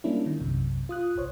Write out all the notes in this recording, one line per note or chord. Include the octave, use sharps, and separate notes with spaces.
G3 A#3 C#4 D4 E4
D#3
B1 F#2 C3
F4 D#6 F#6
G1 C2 C5 C#5